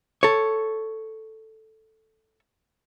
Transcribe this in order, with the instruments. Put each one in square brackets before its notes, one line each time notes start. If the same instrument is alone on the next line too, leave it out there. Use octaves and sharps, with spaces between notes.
[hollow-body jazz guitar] A4 C#5